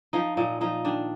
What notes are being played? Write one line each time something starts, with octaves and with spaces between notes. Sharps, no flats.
F3 D#4
A#2 D#4
F3 D#4
D#3 D4